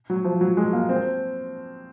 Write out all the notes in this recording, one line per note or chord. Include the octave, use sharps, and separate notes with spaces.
F#3
F3
F#3
G#3
A#3
C4